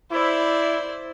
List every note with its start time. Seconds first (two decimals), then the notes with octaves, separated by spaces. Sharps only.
0.12 E4 C5 D5